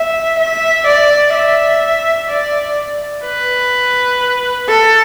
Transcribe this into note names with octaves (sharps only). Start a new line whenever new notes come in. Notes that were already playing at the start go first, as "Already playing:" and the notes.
Already playing: E5
E5
D5
E5
D5
B4
A4